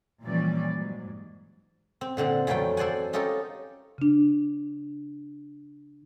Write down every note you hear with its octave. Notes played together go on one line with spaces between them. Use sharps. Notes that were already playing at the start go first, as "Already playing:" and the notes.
A#2 E3 F3 G3 C#4 D5
G#2 F#3
C4
A#2 D3 C4 F#5
F2 E3 F#3 A3 F4 G5
A4 C5 D5 F#5 G#5
C#4 D#4 F4 G4 A4 A#4
C#3 D4